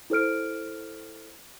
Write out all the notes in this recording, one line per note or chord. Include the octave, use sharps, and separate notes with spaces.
E4 A4 C5 F6 D7